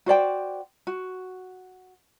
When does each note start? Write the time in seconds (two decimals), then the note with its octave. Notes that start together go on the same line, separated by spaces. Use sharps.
0.06 F#4 C5 D5 G5
0.87 F#4